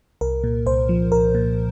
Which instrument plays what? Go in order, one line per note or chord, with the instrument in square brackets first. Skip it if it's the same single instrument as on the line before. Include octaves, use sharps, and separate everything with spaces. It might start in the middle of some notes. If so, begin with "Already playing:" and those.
[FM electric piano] C2 A#4
A#2
C2 C5
F3
C2 A#4
A#2